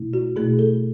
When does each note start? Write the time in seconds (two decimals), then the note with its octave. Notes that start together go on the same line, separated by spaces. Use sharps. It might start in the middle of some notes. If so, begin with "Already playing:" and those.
Already playing: B2 A3 E4
0.14 F#4
0.36 B2 A3 E4 G#4
0.59 A4